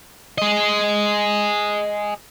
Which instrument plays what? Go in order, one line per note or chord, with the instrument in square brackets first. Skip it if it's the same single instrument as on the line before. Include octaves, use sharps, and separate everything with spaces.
[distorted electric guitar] G#4 D#5